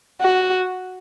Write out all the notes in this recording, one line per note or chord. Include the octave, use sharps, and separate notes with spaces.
F#4